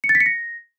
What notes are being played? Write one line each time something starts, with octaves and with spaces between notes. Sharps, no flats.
C#7
A6
B6
C#7
A#6